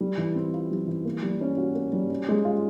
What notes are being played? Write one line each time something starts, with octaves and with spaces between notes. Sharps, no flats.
G3
E3
C4
F4
G3
E3
A#3
G3
C#4
F#4
A#3
G3
C#4
G#3
F4